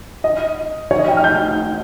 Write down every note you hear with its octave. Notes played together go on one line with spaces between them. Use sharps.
D#5
C#5
D#5
G5
F6
G6